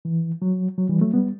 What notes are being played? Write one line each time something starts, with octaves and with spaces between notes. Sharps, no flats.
E3
F#3
F#3
E3 G3
F#3 A3
G3 B3